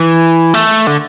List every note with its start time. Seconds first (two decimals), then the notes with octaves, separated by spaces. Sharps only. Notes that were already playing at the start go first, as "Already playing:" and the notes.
Already playing: E3
0.54 A3
0.87 D3